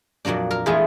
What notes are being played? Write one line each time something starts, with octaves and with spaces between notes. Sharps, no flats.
F2 A#2 F#3 A#3 D4
A#4 F5
E3 G#3 A3 B3 F4 G#4